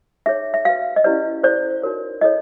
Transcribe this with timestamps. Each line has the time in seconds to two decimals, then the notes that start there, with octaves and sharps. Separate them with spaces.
0.26 D#4 G#4 C#5 E5
0.54 E5
0.65 F#4 B4 F5
0.96 D#5
1.04 C#4 E4 G4 B4 D5
1.43 E4 A4 C5 D5
1.82 D#4 F#4 A#4 C#5
2.21 E4 A4 C#5 D#5